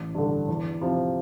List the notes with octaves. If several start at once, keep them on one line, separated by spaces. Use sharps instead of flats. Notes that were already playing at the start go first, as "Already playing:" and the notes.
Already playing: A1
G2 D3
E2
C3 F3